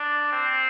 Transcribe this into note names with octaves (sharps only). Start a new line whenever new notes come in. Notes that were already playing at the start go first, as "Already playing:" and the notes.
Already playing: D4
C4